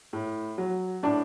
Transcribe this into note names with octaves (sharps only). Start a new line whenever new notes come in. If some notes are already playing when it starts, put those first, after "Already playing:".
A2
F#3
A2 D4